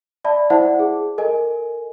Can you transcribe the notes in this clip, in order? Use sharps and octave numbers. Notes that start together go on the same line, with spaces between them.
D5 E5 A5 B5
E4 C5 D5 E5 F#5 A5
G#4
A4 A#4 D#5 G#5